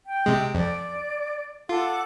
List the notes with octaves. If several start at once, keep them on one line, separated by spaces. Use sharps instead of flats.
G5
C3 G#3
F2 D5
F4 A4 F#5 D6